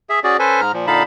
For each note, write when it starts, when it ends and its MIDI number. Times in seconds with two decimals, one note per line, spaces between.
0.10 0.20 68
0.10 0.20 76
0.24 0.37 61
0.24 0.37 66
0.24 0.37 68
0.24 0.37 74
0.39 0.61 61
0.39 0.61 69
0.39 0.61 71
0.39 0.61 72
0.39 0.61 80
0.61 0.72 44
0.61 0.72 82
0.61 0.72 89
0.74 0.87 46
0.74 0.87 53
0.87 1.03 46
0.87 1.03 50
0.87 1.03 63
0.87 1.03 77
0.87 1.03 81
0.87 1.03 83